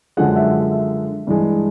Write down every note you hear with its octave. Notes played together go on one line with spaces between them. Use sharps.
F#2 D3 F3 G#3 F#5
E5
E5
G2 E3 G#3